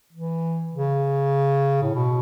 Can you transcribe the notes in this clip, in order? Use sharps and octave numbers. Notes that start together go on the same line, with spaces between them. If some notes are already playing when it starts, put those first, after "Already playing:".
E3
C#3
A2
B2